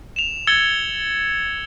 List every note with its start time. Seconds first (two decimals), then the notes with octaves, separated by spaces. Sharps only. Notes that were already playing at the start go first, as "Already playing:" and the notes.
0.16 E7 F7
0.47 E6 G#6 A6 C#7 G7